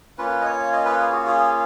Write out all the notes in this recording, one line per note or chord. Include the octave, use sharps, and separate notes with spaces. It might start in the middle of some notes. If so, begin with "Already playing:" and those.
A#3 C#4 F4 B4
D#5
C#5
D#5
B4
G#4
F#4
G#4
G#4